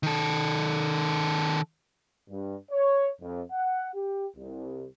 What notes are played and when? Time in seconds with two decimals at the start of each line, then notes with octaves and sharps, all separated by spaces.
0.03 D#3 A4
2.29 G2
2.71 C#5
3.21 F2
3.50 F#5
3.95 G4
4.36 C2